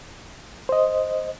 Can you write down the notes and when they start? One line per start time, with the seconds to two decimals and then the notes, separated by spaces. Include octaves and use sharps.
0.69 C5 D#5